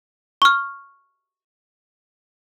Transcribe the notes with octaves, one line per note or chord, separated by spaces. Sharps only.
C#6 F6